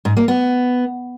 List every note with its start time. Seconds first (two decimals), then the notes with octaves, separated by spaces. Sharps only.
0.05 G#2
0.17 A#3
0.28 B3